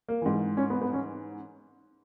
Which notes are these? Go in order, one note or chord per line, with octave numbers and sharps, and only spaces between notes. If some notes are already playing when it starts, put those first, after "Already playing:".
A#3
G#2 E3
C#4
B3
B3
C#4